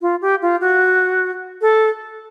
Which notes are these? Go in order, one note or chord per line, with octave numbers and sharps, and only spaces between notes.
F4
G4
F4
F#4
A4